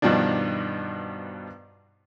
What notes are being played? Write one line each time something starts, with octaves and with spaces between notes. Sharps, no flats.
G2 B2 D#3 F3 D4